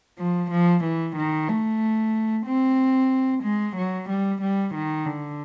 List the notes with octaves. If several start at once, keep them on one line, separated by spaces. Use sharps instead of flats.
F3
F3
E3
D#3
A3
C4
G#3
F#3
G3
G3
D#3
D3